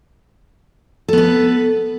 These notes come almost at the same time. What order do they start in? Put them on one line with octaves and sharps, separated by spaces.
A4 B3 B4